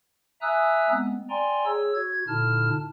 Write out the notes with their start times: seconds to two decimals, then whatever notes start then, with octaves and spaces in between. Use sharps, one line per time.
0.42 E5 G#5 A#5 D#6 E6 F#6
0.90 G#3 B3 C4
1.30 D5 G5 G#5 A#5 C6
1.65 G#4 C#5 E6
1.95 F#4 G#6
2.28 A#2 D3 D#4 E4 A5 F6